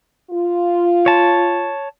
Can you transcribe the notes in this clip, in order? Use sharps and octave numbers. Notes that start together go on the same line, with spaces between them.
F4
C#5 A5